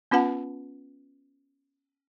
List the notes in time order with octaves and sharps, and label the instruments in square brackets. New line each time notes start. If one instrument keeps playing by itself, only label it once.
[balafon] B3 C#4 F4 B4 F#5 A5